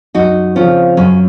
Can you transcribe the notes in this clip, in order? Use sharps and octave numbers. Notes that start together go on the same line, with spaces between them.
F#2 D#4 F#4
C#3 F3 C4 C#4 F4
F#2 C#4 F4